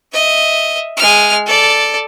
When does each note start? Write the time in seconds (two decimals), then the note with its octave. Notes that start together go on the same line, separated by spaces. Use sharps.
0.13 D#5 E5
0.97 G#3 F6
1.46 A4 D5